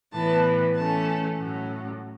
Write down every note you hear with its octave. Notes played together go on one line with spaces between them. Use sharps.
A2 E3 B3 A5
E3 A3 C#4 A5
A2 F#3 C#4